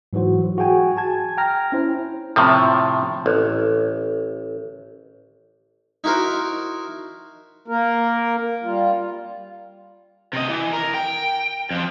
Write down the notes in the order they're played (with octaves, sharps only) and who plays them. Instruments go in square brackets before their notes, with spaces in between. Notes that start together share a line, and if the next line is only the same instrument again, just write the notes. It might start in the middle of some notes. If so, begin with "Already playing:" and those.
[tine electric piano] G#2 E3 F#3 F#4 C5
F#4 G#4 G5 G#5
G#5 A5 G#6
G5 A#5 F6 A#6
C#4 E4 C5
[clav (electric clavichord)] A2 C3 F3
A1
[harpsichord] D#4 E4 F#4 A#4 C5
[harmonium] A#3 A#4
G3 F4
[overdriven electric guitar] C3 D#5
E3
A#4
G5
F2 F3